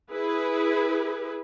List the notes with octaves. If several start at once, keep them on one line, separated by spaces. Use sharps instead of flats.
E4 G#4 B4